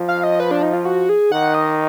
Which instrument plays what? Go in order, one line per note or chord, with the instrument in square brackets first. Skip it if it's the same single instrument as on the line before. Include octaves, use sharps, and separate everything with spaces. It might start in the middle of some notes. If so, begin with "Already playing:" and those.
Already playing: [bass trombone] F3
[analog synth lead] F5
D#5
B4
D4
D#4
F4
F#4
G#4
[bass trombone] D#3 [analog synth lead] F#5
[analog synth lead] D#5